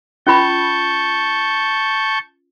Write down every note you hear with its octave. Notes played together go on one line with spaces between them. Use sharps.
C#4 F4 A5 B5 C#6 G6